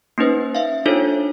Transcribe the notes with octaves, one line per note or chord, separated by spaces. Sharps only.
A#3 C#4 D#4 B4 C5
E5 F5
D4 D#4 F4 A4 C5 C#5